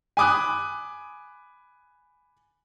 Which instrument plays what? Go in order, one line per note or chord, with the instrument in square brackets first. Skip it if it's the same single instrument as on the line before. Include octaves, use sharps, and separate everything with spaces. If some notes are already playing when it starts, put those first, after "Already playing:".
[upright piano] G#5 B5 D6 D#6 F#6